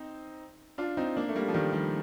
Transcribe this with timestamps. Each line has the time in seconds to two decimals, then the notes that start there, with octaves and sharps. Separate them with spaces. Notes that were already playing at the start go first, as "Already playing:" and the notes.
Already playing: C4 D#4
0.78 D4 F4
0.97 C4 D#4
1.17 A#3 D4
1.29 A3
1.35 G3 A#3
1.48 F3
1.54 D#3 G3
1.72 D#3 G3